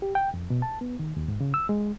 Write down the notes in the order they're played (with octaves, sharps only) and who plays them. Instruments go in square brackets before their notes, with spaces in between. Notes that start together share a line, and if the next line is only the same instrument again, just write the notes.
[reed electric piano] G4
G5
F2
B2
A5
B3
D#3
D#2
G#2
C#3
E6
G#3